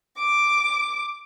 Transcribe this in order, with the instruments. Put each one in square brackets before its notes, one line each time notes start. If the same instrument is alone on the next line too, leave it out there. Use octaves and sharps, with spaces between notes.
[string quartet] D6